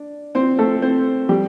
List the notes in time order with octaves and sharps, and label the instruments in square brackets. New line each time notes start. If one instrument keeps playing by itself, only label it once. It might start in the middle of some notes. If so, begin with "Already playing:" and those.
Already playing: [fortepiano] D4
C4 C5
A3 A4
C4 C5
G3 G4